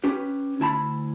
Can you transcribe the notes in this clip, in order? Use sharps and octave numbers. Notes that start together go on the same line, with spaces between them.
C#4 G4 B4
D2 E4 A5 B5